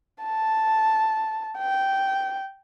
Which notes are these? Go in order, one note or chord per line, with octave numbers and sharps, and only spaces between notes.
A5
G5